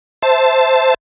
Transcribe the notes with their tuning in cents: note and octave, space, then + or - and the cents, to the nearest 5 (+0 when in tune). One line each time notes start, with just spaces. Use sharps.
C5 -5 E5 +0 A5 +0